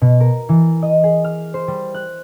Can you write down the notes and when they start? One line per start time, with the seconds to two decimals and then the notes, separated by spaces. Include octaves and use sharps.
0.01 B2
0.20 A#4
0.49 E3
0.82 D#5
1.04 G#4
1.24 F6
1.54 C5
1.68 G3
1.94 F#6